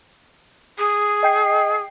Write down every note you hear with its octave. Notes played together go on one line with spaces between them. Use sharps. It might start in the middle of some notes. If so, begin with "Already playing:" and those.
G#4
D#5 G5 C7